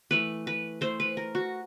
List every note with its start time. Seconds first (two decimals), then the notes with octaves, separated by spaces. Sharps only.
0.11 E3 A3 B4
0.47 B4
0.81 E3 A3 C5
1.00 B4
1.17 A#4
1.35 F#4